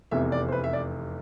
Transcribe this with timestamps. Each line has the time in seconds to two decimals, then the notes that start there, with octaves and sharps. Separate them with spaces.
0.11 F1 E2 C3 E3 E5
0.32 D5
0.48 C5
0.52 B4
0.64 E5
0.73 D5